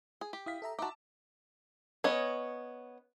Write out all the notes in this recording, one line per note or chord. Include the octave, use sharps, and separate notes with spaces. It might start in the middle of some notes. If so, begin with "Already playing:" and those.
G#4
G4
E4 F5 D#6 B6
A4 E5 A#5
D#4 F#4 E5 A5 D6
B3 C#4 C#5 D#5